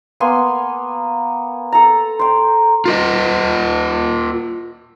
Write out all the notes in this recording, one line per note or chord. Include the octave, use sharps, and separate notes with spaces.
A#3 B3 G#5 C6
A4 A#5
C5 G5
F4 A#4 D#5